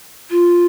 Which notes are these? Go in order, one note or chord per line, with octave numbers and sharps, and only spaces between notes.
F4